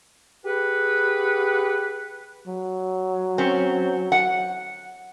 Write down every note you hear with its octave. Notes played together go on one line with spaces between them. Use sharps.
G4 G#4 B4 F#5
F#3
C4 C#4
F#5